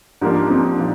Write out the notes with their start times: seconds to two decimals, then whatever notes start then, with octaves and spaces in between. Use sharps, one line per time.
0.21 G#2 F3 A#3 D4 D#4 G4
0.50 C4 D#4
0.79 A#2 F3